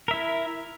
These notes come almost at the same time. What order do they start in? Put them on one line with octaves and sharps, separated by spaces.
A#4 E5 E4